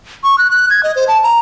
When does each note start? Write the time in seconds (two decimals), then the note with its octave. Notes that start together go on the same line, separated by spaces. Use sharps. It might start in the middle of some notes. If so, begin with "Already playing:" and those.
0.24 C#6
0.38 F#6
0.51 F#6
0.70 G#6
0.83 D#5
0.96 C5
1.08 A5
1.24 A#5